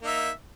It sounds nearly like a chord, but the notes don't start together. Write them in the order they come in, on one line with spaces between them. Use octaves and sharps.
A#3 D#4 E5